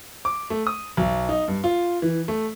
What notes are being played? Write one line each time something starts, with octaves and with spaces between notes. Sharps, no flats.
D6
A3
D#6
B1
D#4
G2
F4
E3
A3